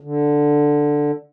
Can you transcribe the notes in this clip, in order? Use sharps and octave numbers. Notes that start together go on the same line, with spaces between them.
D3